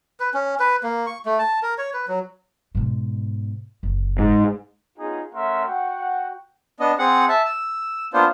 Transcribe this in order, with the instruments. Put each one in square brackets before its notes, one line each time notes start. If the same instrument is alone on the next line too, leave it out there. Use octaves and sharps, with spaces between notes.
[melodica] B4
C#4
B4
A#3
C#6
A3
A5
A#4
C#5
B4
F#3
[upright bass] G#2 B2
F#1
[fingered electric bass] G#2
[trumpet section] B3 C#4 D#4 F4 G#4
A3 C#4 A#4 E5 F#5 C6
F#4 F#5 G5
[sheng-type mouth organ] B3 D4 D#5
C4 G#4 F#5
E5 A5
E6
A#3 B3 D4 F4 C5